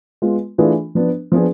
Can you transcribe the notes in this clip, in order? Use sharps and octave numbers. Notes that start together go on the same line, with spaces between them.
G#3 B3 F4
E3 A3 D4 F4 G#4
F3 B3 D4
F3 B3 D4 G#4